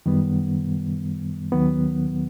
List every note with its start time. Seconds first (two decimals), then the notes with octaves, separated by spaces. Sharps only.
0.06 F#2 D#3 G3 B3
1.52 D#2 D#3 F#3 B3